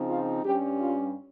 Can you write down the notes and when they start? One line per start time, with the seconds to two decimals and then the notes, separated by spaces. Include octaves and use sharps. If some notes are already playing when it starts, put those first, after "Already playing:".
Already playing: C#3 F3 C4 D#4
0.08 F4
0.44 G2 G3 C#4 G4
0.80 F4